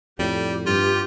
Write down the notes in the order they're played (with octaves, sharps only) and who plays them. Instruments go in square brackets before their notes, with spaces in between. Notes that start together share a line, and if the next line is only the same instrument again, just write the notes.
[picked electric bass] F2 A2 [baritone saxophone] G3 [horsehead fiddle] G4
[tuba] G2 [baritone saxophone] F4 [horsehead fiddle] G4